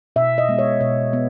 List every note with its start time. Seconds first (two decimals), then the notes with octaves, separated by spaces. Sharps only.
0.16 B2 E5
0.38 D#5
0.49 G#3 B3
0.59 C#5
0.81 B2 C#5
1.13 B3